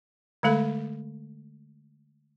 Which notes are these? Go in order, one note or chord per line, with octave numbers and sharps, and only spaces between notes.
D3 G#3 A3 A4 B5